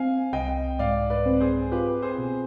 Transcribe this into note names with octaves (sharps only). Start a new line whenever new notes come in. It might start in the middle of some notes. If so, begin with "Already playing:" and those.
Already playing: C4 F5 G#5
C2 D#5 G5
G#2 D5 F5
B4 D5
C4
G#4 C5
F4 G4 B4
G#4 C5
B2